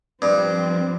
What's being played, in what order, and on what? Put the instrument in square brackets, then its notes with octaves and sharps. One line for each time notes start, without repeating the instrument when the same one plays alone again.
[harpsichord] G2 [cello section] F3 C4